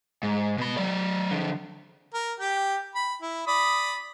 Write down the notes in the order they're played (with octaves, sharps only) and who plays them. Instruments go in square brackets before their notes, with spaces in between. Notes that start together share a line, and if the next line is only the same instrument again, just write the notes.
[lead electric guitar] G#2
B2 B5
F#3 D5
D3 F3
[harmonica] A#4
G4 G5
B5
E4
D5 B5 D#6